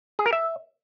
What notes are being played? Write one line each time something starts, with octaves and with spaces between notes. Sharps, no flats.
G#4
A#4
E5